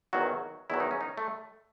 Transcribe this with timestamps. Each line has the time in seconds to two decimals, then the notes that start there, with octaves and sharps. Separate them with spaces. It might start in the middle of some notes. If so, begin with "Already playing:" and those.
0.13 E2 D#3 F#3 F#4
0.70 E2 D#3 F#3 E4
0.80 D#4
0.91 C#4
1.01 D#4
1.17 A3